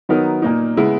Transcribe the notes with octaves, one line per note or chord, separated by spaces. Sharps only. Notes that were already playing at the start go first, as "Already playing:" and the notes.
D#3 F#3 B3 D#4 A#4
A#2 A#3 D#4
C#3 G#3 B3 E4